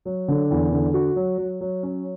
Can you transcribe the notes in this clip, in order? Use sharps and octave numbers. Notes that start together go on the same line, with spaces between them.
F#3
D3
E2
D3
F#4
F#3
F#3
F#3
C#4